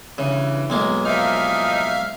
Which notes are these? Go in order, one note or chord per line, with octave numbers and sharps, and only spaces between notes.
G2 C#3 E3
B1 G#3 A#3
E3 F3 D#4 E5 F5 F6